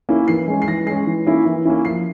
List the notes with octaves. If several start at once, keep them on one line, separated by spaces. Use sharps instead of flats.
A#3 C#4 E4
E3 C7
G#3 C#4
C7
E3 A#6
G#3 C#4 C7
E3
A#3 C#4 E4
E3
A#3 C#4 E4
F3 C7